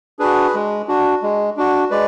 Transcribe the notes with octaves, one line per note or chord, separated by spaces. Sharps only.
D4 F#4 G#4 B4
G#3
D4 F#4
G#3
D4 F#4
G#3 B4 D5